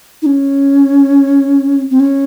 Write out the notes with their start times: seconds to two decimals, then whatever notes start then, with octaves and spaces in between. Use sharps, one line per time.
0.22 D#4
0.26 C#4
1.91 C4
2.00 C#4